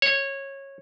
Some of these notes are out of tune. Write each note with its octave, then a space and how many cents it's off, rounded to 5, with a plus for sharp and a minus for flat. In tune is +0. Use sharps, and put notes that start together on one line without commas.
C#5 -15